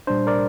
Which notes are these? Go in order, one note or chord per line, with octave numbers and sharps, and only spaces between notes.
A#2 G3 D4 C5
A#4 D5